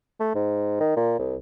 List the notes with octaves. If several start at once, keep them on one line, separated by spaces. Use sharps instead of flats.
A3
G#2
D#3
A#2
C2